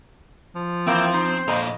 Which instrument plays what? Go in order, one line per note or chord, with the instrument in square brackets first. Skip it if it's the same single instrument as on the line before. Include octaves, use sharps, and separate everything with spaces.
[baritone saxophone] F3
[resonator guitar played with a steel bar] E3 F5 [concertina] A#3 G5 E6 [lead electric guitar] C4
[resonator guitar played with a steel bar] D#4 [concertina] C5
[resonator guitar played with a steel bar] F2 D#5 A#5 [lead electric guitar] A#2 A4